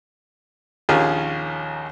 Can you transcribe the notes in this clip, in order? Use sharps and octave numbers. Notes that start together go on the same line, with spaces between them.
A#1 D#2 C#4 F4 G#4 G#5